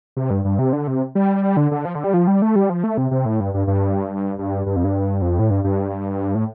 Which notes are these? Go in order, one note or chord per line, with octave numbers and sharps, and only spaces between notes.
C3
G2
G2
C3
D3
C3
G3
D3
D3
F3
D3
G3
F3
G3
A3
G3
F3
A3
C3
C3
A2
G2
G2
G2
G2
G2
F2
G2
F2
A2
G2
G2
A2